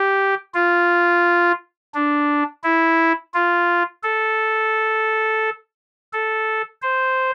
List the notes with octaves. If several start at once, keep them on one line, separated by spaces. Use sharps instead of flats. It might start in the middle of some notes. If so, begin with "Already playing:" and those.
Already playing: G4
F4
D4
E4
F4
A4
A4
C5